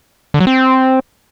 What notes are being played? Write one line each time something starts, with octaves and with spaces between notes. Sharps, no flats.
D3
F#3
C4